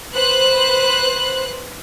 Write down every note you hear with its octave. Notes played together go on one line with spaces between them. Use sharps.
B4 C5 F#6